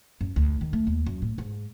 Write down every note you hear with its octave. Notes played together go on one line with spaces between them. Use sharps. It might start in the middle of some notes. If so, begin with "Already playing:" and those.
F#2
D2
D#3
A3
D#2
F#2
A2
G#2